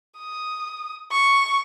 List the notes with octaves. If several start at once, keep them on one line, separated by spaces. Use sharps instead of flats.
D#6
C#6